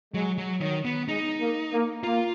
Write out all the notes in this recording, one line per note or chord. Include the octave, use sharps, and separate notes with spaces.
F#3 G#3
F#3
D#3 F#3
B3
G#3 D#4
A#3
A#3
A#3 F4